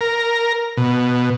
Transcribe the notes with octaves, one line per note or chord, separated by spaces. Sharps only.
A#4
B2